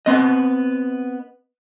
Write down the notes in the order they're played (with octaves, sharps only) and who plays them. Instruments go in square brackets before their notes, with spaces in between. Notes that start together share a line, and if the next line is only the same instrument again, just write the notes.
[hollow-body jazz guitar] B3 C4 D#5